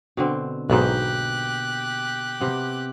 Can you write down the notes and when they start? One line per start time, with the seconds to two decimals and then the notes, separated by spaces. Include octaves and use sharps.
0.17 B2 D3 C4
0.70 B1 G#2 B2 A#3 G4 F#6
2.40 C3 B3